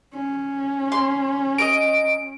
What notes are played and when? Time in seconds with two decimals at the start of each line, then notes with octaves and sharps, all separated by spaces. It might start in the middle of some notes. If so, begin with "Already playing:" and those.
0.13 C#4
0.92 C6
1.58 A#4 D5 D#5 D7